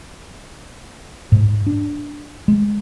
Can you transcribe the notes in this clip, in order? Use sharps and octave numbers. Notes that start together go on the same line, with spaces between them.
G#2
D4
G#3